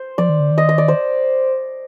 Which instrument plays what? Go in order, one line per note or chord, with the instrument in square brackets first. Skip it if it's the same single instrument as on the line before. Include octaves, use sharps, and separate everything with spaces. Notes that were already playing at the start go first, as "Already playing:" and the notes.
Already playing: [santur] C5
[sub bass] F3 [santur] D5
[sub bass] D#3
D3
D#3
[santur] D#5
D#5
D5
C5